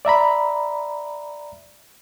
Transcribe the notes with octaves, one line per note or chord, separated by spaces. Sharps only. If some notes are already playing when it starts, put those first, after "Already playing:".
D5 E5 A#5 B5